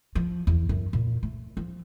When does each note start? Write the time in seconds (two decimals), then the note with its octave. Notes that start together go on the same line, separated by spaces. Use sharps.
0.15 F3
0.47 E2
0.69 F#2
0.93 A#2
1.23 A3
1.57 F3